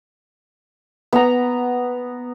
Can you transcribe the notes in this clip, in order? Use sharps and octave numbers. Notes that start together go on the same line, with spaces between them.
B3 A#5